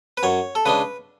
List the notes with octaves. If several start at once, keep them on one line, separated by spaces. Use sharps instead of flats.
B4
F#2 C#5
A4
C#3 G#3 D4 B4